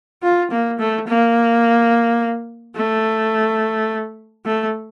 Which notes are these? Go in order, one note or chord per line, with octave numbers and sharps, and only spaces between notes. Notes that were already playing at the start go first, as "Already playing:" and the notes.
F4
A#3
A3
A#3
A3
A3